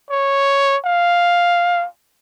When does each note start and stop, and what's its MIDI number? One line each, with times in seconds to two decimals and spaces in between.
0.11 0.77 73
0.85 1.86 77